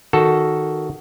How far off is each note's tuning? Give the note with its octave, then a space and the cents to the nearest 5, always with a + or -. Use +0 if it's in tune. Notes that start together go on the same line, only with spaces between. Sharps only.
D#3 +0 F#4 +10 A4 +0